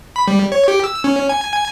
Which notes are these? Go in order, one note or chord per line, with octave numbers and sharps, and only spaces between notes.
B5
G3
C#5
G4
E6
C#4
G#5
G#5